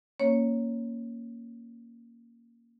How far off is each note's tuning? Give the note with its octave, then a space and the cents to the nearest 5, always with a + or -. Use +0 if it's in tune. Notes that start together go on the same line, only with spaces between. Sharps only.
A#3 +0 C#4 +0 C#5 +0